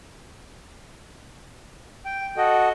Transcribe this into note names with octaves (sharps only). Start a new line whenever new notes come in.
G5
F#4 A4 D#5